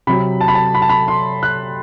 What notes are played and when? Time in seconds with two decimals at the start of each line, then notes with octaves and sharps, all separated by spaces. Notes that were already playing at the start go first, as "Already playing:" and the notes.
0.07 C3 F#3 B5
0.41 A5
0.48 B5
0.55 A5
0.75 B5
0.82 A5
0.89 B5
1.08 C6
1.43 F#6